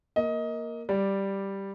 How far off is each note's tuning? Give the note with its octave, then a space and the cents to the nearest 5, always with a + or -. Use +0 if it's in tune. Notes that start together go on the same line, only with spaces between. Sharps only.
A#3 +0 D#5 +20
G3 +0 D5 +0